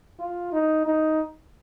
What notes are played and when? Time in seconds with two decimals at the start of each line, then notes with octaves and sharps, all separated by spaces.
0.19 F4
0.52 D#4
0.86 D#4